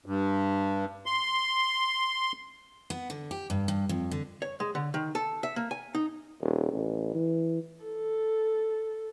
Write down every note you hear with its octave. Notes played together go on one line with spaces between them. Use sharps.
G2
C6
B3
D3
G4
G2
G2
F2
D3
C#5
G#3
D3
D#3
A4
E5
A#3
G#5
D#4
D#1
A1
E3
A4